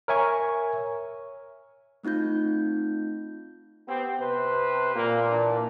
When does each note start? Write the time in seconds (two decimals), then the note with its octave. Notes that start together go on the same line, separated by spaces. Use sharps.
0.08 A#4 C#5 E5 G#5 C#6
2.03 A3 C4 D#4 F4 G6
3.87 B3 C4 G4
4.19 C3 B4 C5
4.96 A#2 A#3
5.30 E3 D4